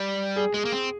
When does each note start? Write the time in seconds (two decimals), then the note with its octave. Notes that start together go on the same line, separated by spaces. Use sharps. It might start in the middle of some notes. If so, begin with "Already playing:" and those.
Already playing: G3
0.36 G#4
0.54 G#3 G#4
0.65 A#3
0.72 C4